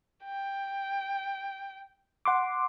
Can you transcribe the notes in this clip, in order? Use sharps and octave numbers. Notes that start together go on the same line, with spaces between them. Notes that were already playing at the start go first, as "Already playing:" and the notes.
G5
F#5 C6 D6